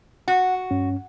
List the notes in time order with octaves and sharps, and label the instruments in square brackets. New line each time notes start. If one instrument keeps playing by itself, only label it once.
[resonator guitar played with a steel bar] F#4 [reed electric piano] F#5
[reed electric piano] G2 C#4